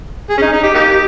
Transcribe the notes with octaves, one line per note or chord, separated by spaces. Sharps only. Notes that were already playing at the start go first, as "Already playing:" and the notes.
G#4
C#4
D#4
D#4
G4
A#3 D#4 G4